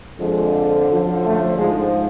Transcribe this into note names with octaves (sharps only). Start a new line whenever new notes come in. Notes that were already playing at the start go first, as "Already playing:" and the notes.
F2 D3 F3 G#3
F#2 D3 F3
A3
G#2 F3 G#3